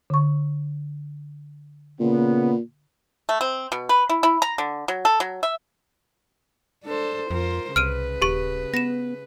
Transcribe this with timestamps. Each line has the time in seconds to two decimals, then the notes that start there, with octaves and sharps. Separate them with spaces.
0.10 D3 C#6
2.00 A#2 C#3 B3
3.29 A3
3.41 C4
3.72 B2
3.89 B4
4.09 E4
4.23 E4
4.42 A#5
4.58 D3
4.88 F#3
5.05 A4
5.20 F#3
5.43 E5
6.85 D4 A4 C5
7.30 F2 F4 A#4 C5
7.76 C2 C#3 B4 F6 D7 D#7
8.22 D#1 G4 C#6 D7
8.74 B3 A#6 E7